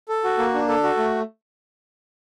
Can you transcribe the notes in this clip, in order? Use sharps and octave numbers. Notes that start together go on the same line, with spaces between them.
A4
F#4
A#3
D4
A4
F#4
A3